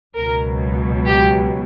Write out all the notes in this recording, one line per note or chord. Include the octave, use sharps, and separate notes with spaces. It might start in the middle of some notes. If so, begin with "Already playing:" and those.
C#2 B2 F#3 A#4
G4